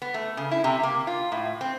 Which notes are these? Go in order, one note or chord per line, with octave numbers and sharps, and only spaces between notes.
B3
A3
C#3
E4
C3
A#3
F4
A2
C4